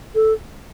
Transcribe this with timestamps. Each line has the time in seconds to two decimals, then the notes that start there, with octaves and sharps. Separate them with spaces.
0.15 A4